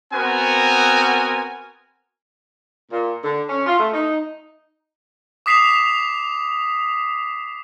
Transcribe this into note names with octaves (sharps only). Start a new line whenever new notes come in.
B3 C4 F#4 A#4 G#5
A#2
D3
C#4
F4
A3
D#4
D6 D#6 B6 C7 E7 F7